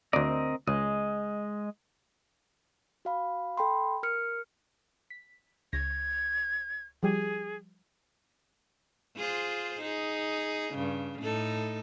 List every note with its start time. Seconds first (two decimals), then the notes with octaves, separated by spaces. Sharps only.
0.13 D2 C4 A#4 D5 D#5
0.68 C#2 G#3 D#5
3.05 F#4 F5 B5
3.57 A4 G5 B5 C6
4.03 A#4 F6 C#7
5.10 B6
5.73 C#2 G#6 A#6
7.03 F3 G3 G4 G#4
9.17 F4 G#4 C5
9.81 D#4 G#4
10.74 G2 C#3
11.20 A2 D#4 A4